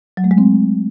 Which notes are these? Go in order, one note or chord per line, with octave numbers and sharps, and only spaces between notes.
F#3
A3
G#3
C4